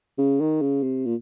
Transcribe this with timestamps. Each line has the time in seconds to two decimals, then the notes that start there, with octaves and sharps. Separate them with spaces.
0.18 C#3
0.40 D#3
0.61 C#3
0.83 C3
1.05 A#2